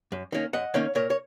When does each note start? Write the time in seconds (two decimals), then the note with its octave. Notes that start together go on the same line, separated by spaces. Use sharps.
0.12 F#2
0.32 D#3 A#3 C#4
0.53 F#2 D#5 F#5
0.74 D#3 A#3 C#4 C#5 F5
0.95 A#2 A#4 C#5
1.10 C#5